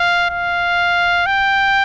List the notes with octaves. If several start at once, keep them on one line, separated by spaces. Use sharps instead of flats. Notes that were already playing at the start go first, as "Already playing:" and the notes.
Already playing: F5
F5
G5